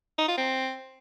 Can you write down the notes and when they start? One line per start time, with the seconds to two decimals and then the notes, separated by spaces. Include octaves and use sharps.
0.18 D#4
0.28 F4
0.38 C4